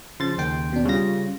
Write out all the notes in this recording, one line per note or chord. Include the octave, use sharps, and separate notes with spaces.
C#3 F3 C6 A6
D#2 G5
B2 D4
C#3 G3 F4 A#6